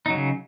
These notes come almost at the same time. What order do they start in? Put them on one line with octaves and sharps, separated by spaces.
D#4 F#3 C#3